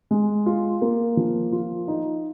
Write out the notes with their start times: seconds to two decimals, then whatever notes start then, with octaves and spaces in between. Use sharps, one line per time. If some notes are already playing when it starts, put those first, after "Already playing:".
0.11 G#3
0.46 F4
0.82 A#3
1.17 F3
1.52 F4
1.88 D#4